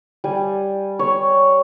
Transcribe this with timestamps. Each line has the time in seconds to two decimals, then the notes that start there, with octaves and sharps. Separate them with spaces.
0.24 G3 G#5
0.99 C#5